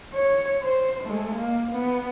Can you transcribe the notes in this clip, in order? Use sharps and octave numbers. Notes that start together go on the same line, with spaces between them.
C#5
C5
G#3 A3
A#3
B3